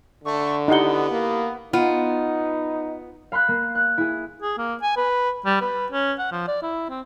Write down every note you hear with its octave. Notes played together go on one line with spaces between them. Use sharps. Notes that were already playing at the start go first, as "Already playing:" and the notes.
D3 A3 C#6
B3 D#4 E4 G4 F#5 G7
A#3
B3 D#4 F4
F5 B5 C6 F#6
A#3
F#6
E4 G#4
G#4
A#3
G#5
B4
G3
B4
C#4
F#5
F3
D5
E4
C4